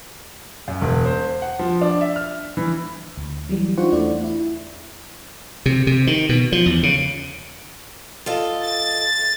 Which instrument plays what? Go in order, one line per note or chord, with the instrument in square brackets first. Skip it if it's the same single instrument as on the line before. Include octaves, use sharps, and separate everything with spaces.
[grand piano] F#2
E1
C5
F#5
F3
D4
E5
F6
E3
[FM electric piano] D2
E3 F#3 G3
D4 D#4 F4 C5 F#5 C#6
E2 A3 E4 D5
E4
[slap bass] C3
C3
D#3
B2
F3
E2
C#3
[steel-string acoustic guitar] F4 A4 D#5
[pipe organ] A6